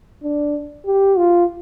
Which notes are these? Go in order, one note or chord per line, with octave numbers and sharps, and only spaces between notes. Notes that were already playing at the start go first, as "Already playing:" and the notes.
D4
G4
F4